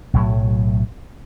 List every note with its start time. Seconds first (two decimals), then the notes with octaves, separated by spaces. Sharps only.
0.14 B1 A2 F#3